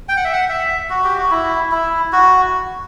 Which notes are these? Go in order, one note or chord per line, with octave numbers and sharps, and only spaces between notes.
G5
F#5
E5
F#5
E5
F#4
G4
F#4
E4
E4
F#4